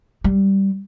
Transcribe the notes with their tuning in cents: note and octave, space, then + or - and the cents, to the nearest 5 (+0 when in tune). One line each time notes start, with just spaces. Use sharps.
G3 -5